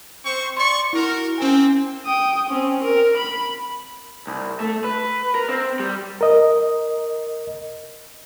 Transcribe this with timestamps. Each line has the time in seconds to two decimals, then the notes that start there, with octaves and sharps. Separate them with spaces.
0.24 C4 C5 C#6
0.57 D5 C6 C#6
0.93 E4 F#4 A#4
1.38 A#3 C4 C#4 G#5
2.06 G5 D#6
2.49 C4 C#4
2.83 A#4
3.17 B5
4.27 C2
4.60 A3
4.84 B4
5.35 A#4
5.49 C4
5.80 G3
6.21 A#4 D#5